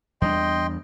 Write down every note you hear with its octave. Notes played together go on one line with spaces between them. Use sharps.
E2 G3 D4 D#5 G5 C6